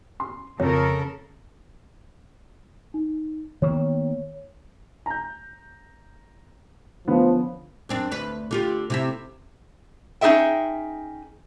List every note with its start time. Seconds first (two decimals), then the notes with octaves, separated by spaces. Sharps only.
0.20 C6
0.60 F2 C#3 A4 A#4 C#5
2.94 D#4
3.62 D#3 A#3 B3 C#5
5.06 A#5 G6
7.07 D3 F3 B3 C#4
7.89 F#2 C4 D4
8.11 D2 B4
8.51 D3 F4 G4
8.90 C3 E4 E5
10.21 C#4 D#4 F#4 G#4 E5 G5